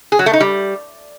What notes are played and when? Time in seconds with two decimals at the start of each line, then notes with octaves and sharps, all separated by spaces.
0.12 G#4
0.19 F#3
0.26 A3
0.33 D#4
0.40 G3